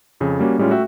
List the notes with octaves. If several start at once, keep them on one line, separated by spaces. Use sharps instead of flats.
F2 C#3
G3 A#3 C#4 F#4
A2 G3 G#3 C#4 F4
A3 F#4 E5 G5